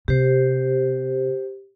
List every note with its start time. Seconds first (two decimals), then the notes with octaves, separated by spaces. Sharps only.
0.08 C3 G4 C5